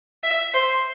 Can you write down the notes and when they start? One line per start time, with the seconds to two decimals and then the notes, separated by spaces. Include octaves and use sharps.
0.24 E5
0.54 C5